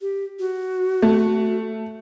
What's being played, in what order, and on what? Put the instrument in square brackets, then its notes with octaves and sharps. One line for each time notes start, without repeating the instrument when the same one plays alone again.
[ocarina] G4
F#4
[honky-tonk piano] A3